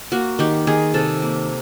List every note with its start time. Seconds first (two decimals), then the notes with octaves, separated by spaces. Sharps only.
0.12 A#3 F#4
0.39 D#3 G4
0.67 D#3 G#4
0.94 C3 A4
1.22 A#3